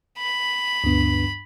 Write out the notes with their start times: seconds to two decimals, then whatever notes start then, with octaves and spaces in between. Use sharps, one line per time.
0.19 B5
0.84 D2 G2 B3